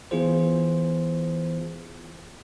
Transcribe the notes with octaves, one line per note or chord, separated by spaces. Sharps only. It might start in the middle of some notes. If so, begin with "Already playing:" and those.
E3 B3 E4 F4 G#4 C5